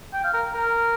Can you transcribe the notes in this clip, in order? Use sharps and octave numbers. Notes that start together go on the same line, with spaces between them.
G5
F5
A#4
A#4